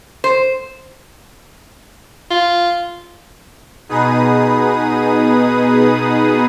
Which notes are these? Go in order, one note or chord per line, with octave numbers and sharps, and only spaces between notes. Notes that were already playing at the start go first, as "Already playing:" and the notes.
C5
F4
B2 B3 D#4 G#4 B4 D#6